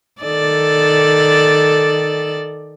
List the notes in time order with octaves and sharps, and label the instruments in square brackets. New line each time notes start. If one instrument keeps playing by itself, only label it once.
[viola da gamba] D#3 A4 D5